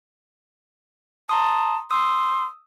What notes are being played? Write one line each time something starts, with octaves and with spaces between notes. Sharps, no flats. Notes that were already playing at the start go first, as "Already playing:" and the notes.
A5 A#5 C6 D#6
C6 D#6 E6